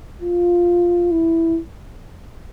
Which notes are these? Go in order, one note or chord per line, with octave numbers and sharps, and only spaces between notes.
F4
E4